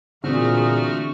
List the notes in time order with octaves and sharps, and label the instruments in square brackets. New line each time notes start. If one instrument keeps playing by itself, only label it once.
[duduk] A#2 [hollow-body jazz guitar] D3 E3 C4 [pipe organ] A3 F#4 F6 [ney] G#4